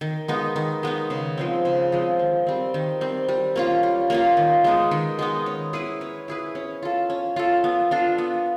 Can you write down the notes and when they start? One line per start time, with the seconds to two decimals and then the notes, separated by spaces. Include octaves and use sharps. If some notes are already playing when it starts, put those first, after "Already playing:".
0.01 D#3
0.28 G#3 B3 D#4
0.56 D#3
0.83 G#3 B3 D#4
1.10 C#3
1.37 F3 G#3 C4
1.65 C#3
1.92 F3 G#3 C4
2.19 D#3
2.47 G3 C4
2.74 D#3
3.01 G3 C4
3.28 G3
3.56 A#3 C#4 F4
3.83 G3
4.10 A#3 C#4 F4
4.37 D#3
4.64 G#3 B3 D#4
4.91 D#3
5.19 G#3 B3 D#4
5.46 C#4
5.73 E4 G#4 B4
6.01 C#4
6.28 E4 G#4 B4
6.55 C#4
6.83 F4 A4
7.10 C#4
7.36 F4 A4
7.64 B3
7.91 D4 F4 A4
8.18 B3